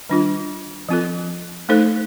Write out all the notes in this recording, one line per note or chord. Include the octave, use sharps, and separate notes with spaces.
D#3 G3 D4 F4
F3 C4 F4 A4
A3 D#4 A4 C5